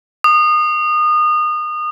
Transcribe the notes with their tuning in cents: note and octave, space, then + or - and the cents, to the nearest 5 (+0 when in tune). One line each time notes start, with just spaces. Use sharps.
D#6 -30